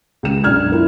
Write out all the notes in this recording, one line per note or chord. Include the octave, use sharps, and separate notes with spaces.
C#2 E7
B1 F#2 D4 F6 G#6
E4 F4 A#4